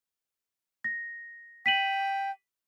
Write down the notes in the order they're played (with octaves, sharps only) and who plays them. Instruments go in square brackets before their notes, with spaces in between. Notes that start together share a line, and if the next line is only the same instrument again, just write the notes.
[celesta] A#6
[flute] G5 [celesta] B6 D#7 F#7